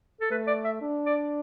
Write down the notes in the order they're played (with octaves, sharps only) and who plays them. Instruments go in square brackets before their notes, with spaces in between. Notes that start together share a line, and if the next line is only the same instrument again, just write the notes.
[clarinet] A4
[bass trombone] A3 [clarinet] B4
[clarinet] D5
E5
[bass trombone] D4
[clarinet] D5